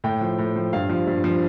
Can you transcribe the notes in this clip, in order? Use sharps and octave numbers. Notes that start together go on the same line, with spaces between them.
A2 G5
F3
A2
F3
G2 F5
F3
G2
F3